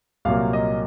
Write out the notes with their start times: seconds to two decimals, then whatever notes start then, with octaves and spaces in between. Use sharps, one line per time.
0.25 C2 A#2 F#3 A#3 F5
0.53 D#5